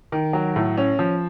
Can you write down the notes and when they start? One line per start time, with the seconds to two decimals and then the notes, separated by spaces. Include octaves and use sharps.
0.12 D#3
0.33 F#3
0.56 A2
0.77 C#4
0.99 F3